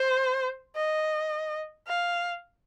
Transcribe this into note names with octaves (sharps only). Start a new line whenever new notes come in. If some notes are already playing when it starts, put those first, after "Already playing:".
Already playing: C5
D#5
F5